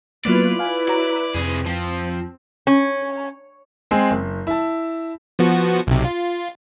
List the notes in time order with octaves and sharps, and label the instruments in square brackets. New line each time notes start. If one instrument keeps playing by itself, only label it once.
[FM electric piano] F#3 A#3 B3 [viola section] E4 F4 B4 [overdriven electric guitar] D5
[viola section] E4 B4 [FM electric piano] F5 G#5
[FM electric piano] F#4 C#5 A#5 [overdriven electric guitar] D5
[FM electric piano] F2 [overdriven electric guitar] C3 G#4
[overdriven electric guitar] F3 [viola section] C4
[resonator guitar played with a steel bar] C#4
[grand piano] G#3 C4 G#4
F#1
E4 A5
[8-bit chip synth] F3 B3 F#4
B1 C3
F4